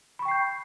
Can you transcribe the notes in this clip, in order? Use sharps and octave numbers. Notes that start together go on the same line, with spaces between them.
G5 B5 C#6 G6 C7